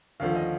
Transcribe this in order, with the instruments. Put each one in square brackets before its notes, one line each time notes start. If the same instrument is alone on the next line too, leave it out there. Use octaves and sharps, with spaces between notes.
[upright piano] D#2 D3 F3 A3 F5
D#5